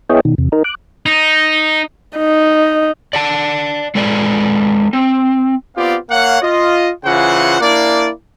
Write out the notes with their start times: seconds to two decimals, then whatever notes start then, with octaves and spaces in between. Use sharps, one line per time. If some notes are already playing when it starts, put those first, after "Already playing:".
0.10 B3 E4 G#4 C#5 D#5 G5
0.25 B2 D#3
0.38 E2 C3
0.52 D#4 A#4
0.64 D6 F#6
1.06 D#4
2.17 D#4
3.13 D5 F#5 A5
3.95 G#3 A4 B4 D5
4.93 C4
5.76 B3 C4 F4 G4 D5 F5
6.10 A#3 C#5 F5 F#5
6.43 F4 D#5
7.05 C#3 E3 F4 C5 F#5
7.61 A#3 D4 E4 D5